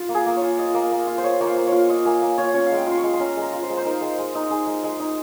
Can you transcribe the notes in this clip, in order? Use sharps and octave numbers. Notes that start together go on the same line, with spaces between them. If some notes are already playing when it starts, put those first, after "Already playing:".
Already playing: F4
A#3
G#4
A#3
C#5
F4
F4 D#5
A#3
A#3
F4
C5
F4 C#5
A#3 C#5
C5
A#3
F4 C#5
F4 D#5
A#3 G#5
A#3
F4 C#5
C#4 C#5
F5
G#3
G5
F4 C6
C#6
G#3
C6
C#4 A#5
G#3
A#5
F4
C5
G#3
C5
D#4 A#4
G#3
G#3
D#4
D#4 G#4
G#3
G#3
D#4